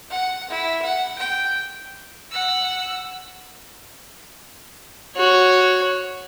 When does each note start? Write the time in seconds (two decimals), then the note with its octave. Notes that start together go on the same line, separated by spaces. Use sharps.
0.11 F#5
0.50 E4
0.82 F#5
1.18 G5
2.31 F#5 E6
5.16 F#4 C#5